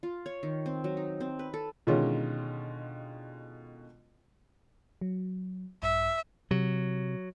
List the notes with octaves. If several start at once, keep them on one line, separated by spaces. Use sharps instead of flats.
F4
C#5
D#3
C4
F#3
D#4
C4
B4
A4
B2 D3 D#3 G#3 C#4 F4
F#3
A#1 G2 E5
C3 F#3